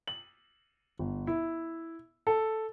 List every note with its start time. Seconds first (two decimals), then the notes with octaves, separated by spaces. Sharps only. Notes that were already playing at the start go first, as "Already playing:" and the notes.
0.08 F#7
0.99 G1
1.27 E4
2.27 A4